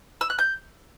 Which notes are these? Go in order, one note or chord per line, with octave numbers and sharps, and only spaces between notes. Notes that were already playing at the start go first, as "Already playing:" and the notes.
E6
F#6
G6